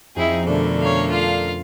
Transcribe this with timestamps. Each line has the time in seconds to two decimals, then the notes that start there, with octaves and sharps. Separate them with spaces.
0.16 F2 C4 D#4 E4 G#4
0.46 B2 D3 A3 C#4 D4 A#4 B5
0.80 C4 C#4 C#5 F5 A#5
1.10 F4 F5